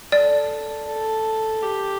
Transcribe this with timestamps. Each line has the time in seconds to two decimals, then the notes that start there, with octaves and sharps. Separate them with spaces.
0.12 A4 D5
0.88 A4
1.62 G4